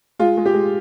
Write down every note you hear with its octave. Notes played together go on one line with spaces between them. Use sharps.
G#3 F4
G#3
G4
G#3